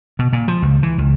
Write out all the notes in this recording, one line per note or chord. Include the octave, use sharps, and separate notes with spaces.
B2
A#2
F3
C#2
E3
C#2